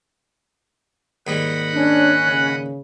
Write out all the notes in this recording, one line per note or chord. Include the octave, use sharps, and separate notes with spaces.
D#2 G#2 G3 D#5 F#5 B5
C#4 D4 F#6
C#3